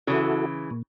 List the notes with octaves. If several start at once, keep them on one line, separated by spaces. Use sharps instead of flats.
C#3 E3 E4 F#4 A4
A#2